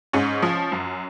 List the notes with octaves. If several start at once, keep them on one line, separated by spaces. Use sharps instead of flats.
G#2 C#4
F3
F#2